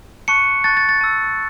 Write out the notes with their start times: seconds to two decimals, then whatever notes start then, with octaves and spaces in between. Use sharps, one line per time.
0.28 A5 C#6 F#6 C#7
0.64 A5 C#6 F#6 A6
0.77 A6
0.89 A6
1.01 A5 E6